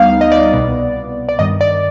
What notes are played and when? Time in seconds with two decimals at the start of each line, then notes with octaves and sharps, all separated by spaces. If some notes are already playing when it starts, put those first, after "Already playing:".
Already playing: D2 G3 B3 D#4 F5
0.10 F5
0.21 D#5
0.32 D5
0.43 D5
0.53 C2 B2 B3
1.29 D5
1.39 G2 D#3 G3 D#5
1.61 D5